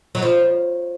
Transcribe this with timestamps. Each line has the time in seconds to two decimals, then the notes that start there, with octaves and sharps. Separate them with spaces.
0.15 F#3
0.22 F3